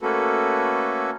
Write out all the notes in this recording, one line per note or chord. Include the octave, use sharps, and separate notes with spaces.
A3 A#3 C#4 F#4 A4 B4